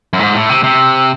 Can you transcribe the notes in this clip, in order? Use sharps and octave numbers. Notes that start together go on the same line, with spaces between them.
F#2
G#2
A2
C3
C3